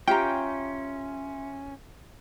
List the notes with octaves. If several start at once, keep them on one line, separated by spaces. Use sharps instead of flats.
C#4 F4 G4 E5 G5 A#5 C6